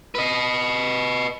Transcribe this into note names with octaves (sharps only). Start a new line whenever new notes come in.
B4 D#5